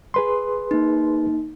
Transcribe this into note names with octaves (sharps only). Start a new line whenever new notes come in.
G#4 B4 C6
A#3 D#4